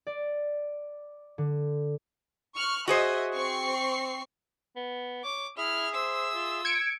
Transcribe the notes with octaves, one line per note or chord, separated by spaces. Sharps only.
D5
D3
C#6 F6 F#6
F#4 G#4 C5 D#5 E5
C4 C#6 C7
B3
C#5 D6
E4 G#4 E5 F6
C5 E6
F4
G#6 C#7 D7